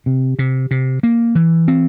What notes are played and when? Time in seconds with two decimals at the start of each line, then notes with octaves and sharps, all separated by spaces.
0.06 C3
0.39 C3
0.71 C3
1.03 A#3
1.35 E3
1.68 C4